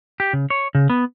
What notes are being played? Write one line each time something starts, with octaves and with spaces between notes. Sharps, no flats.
G4
C#3
C#5
C#3
B3